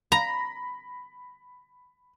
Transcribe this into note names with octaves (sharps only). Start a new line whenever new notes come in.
A#5 B5 A#6